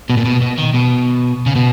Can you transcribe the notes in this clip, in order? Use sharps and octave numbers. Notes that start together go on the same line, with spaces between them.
B2
A#2
B2
B2
D#3
B2
C#3
B2